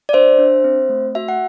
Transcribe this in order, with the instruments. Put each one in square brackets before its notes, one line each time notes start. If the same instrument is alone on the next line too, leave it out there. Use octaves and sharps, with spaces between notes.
[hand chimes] D5
D4 C5 E5
D4
C4
A3
F#4 E5
F#5